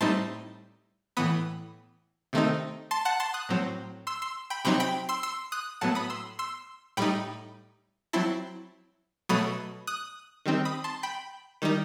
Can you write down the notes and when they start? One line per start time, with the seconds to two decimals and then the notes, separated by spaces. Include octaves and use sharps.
0.01 A2 G3 C4 D#4 A5 C6
1.17 A2 E3 B3 B5 D#6
2.33 C3 D#3 A3 C4 D#4
2.91 A5 C6
3.05 F#5 A5
3.20 A5 C6
3.34 D#6 F#6
3.49 A2 F#3 C4
4.07 C6 E6
4.22 C6 E6
4.50 G5 B5
4.65 C3 F#3 C4 D#4 G5 B5
4.80 G5 B5
5.09 C6 E6
5.23 C6 E6
5.52 D#6 F#6
5.81 A2 F#3 B3 F#5 A5
5.95 B5 D#6
6.10 C6 E6
6.39 C6 E6
6.97 A2 G3 D#4 G5 B5
8.13 F#3 C4 E4 A5 C6
9.29 B2 F#3 A3 B5 D#6
9.87 D#6 F#6
10.46 D#3 G3 C4 D#4
10.65 B5 D#6
10.84 A5 C6
11.03 G5 B5
11.62 D#3 G3 D#4